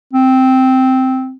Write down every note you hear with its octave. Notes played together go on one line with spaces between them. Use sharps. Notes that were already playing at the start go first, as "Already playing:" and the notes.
C4